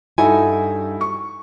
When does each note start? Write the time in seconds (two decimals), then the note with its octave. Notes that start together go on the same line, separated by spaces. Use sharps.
0.18 G2 D#4 E4 F#4 A4 G#5
1.01 C#6